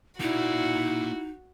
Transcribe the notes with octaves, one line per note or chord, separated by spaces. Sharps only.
A#3 D#4 E4 F#4 D5